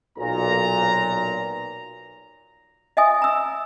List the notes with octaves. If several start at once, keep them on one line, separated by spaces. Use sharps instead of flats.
B1 A#2 A#5
D#5 E5 G#5 D#6
A#5 E6